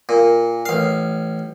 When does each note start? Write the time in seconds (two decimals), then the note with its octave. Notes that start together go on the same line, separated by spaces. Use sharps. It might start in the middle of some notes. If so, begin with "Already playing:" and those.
0.09 A#2
0.66 A1 F5